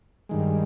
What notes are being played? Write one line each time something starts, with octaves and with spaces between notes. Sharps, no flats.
G2 D#3 G#3